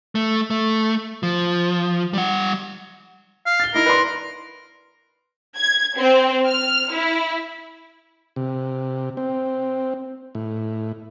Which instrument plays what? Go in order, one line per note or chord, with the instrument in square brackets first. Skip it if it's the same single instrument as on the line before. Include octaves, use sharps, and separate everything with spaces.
[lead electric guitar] A3
A3
F3
G3 F#5
[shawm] F5
[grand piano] A6 G7
[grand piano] D#4 E4 [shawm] A#4
[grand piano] B4 D5 C6
[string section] G#6
C4
F6
E4
[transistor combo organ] C3
C4
A2